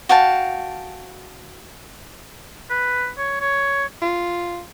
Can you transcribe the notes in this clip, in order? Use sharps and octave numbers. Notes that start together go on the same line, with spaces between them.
F#4 F5 G5 A5
B4
C#5
C#5
F4